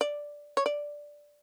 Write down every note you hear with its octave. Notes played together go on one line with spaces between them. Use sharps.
D5
C#5
D5